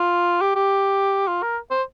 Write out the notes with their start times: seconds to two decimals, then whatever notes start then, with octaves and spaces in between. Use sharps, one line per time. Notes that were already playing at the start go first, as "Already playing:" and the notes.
Already playing: F4
0.41 G4
0.55 G4
1.28 F4
1.42 A#4
1.71 C5